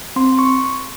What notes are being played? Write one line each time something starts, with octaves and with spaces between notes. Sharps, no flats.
C4 C6
C#6